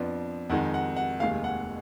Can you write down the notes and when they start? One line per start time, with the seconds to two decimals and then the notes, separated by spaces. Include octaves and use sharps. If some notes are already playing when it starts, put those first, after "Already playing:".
Already playing: F2 F3 B3 D4
0.50 F2 D#3 G#3 D#4 F#5
0.74 F#5
0.96 F#5
1.20 F1 D#2 D#3 G#3 F5
1.44 F#5